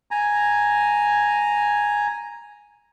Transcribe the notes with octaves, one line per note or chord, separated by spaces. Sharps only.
G#5 A#5